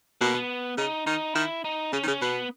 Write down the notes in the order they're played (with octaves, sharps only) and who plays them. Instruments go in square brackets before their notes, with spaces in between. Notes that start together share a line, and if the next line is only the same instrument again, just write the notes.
[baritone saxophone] B2 [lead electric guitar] A#3
[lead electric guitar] B3
[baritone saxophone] C#3 [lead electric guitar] D#4
[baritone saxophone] D#3 [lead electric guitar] D#4
[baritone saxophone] D#3 [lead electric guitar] E4
[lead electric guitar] D#4
[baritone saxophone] C#3 [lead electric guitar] C#4
[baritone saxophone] D#3
[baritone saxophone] C#3 [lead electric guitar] C#4
[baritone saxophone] B2 [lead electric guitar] B3